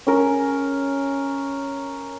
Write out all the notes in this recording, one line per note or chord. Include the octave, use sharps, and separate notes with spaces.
C#4 A#4